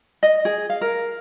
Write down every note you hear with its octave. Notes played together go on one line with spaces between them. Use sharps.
D#5
G#4
F5
A#4